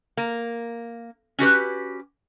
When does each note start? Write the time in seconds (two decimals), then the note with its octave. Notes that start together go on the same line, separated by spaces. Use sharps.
0.17 A#3
1.39 C#4 F#4 G4 B4